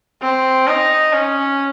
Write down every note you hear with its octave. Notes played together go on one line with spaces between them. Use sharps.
C4
D#4
C#4